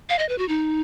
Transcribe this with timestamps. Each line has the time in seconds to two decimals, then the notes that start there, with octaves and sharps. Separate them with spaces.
0.09 F5
0.19 D#5
0.29 B4
0.38 F#4
0.48 D#4